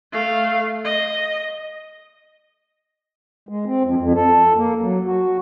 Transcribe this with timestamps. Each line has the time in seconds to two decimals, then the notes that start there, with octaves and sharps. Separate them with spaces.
0.12 A3 F5
0.84 D#5
3.49 G#3
3.65 C4
3.83 F2
3.98 F2
4.15 A4
4.57 A#3
4.82 F#3
5.06 F#4